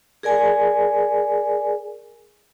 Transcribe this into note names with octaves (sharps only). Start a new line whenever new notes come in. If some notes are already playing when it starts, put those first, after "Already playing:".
G#4 A#4 D5 G#5